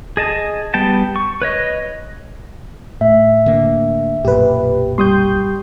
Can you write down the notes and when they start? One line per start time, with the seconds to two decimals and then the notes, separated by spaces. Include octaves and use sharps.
0.17 G#4 D#5 A5
0.74 G3 B3 G5 A5
1.16 C#6
1.42 B4 C#5 D#5
3.01 A2 E5
3.46 D3 A#3
4.25 B1 F#2 A#2 G4 B4
4.98 G3 C6 C#6 D#6 G6